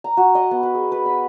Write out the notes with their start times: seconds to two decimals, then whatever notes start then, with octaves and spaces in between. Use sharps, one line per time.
0.04 A#5
0.17 F#4
0.35 D#5
0.51 B3
0.63 B4
0.75 G#4
0.92 B4
1.06 B5